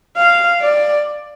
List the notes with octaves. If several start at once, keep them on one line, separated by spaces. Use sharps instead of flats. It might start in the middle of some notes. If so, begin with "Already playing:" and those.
F5
D5